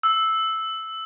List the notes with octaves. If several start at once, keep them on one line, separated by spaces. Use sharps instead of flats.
E6